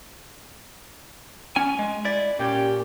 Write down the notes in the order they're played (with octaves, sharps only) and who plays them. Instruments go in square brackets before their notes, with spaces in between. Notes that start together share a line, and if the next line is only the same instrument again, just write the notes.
[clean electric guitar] C#4 G#5
G#3
E4 D5
[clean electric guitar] A#2 [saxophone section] C#4 G4